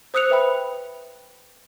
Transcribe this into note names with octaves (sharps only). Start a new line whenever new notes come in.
C5 D#6 E6 F#6 C#7 F7
B4 E5 G5 B5